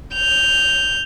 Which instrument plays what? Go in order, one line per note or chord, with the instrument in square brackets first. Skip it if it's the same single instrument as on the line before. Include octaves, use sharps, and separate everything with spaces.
[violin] G6 F7